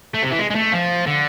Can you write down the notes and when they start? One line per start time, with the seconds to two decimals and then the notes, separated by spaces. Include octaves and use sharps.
0.14 A3
0.22 C3
0.31 E3
0.39 G#3
0.50 G#3
0.55 A3
0.72 F3
1.07 D3